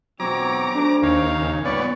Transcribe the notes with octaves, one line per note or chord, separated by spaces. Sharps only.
E2 B2 F#3 C4 C#5 A#5 D6
A3 D4 C5
D#2 C#5 F5
C#3
G2 A#2 B3 C#5 D5